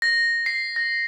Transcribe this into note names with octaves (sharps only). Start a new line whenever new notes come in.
A#6
C7
A#6